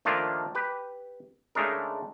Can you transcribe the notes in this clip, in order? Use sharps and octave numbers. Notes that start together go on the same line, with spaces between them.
D#3 F3 A3 A#3 D4 F4
G4 B4
C#3 G#3 A3 D4 D#4 A#4